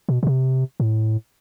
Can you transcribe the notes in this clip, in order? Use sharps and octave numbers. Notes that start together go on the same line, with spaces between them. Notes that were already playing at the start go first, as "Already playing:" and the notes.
B2
B2
C3
A2